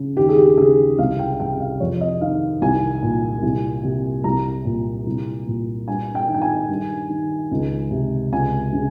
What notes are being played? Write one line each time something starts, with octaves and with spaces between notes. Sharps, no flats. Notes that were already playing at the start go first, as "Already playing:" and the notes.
Already playing: C#3
D#2 G4
G#4
G4
C#3 G#4
C2 F5
G5
C3 G5
F5
F2 C#5
D#5
D#3 F5
C2 G#5
A#2
C2
C3
C2 A#5
A#2
C2
A#2
G2 G#5
G5
D#3
G5
G#5
G2
D#3
C#2
C3
C#2 G#5
C#3